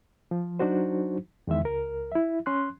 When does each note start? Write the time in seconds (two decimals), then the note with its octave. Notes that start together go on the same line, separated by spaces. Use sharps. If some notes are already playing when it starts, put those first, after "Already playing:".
0.31 F3
0.59 F#3 D4 D#4 F#4 C5
1.47 E2 D#3 G#3 E5
1.61 C#2 A#4
2.12 E4 E5
2.46 C#4 C6 F#6